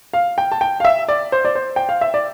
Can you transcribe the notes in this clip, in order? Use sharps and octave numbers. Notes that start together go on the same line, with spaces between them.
F5
G5
A5
G5
F5
E5
D5
C5
D5
C5
G5
F5
E5
D5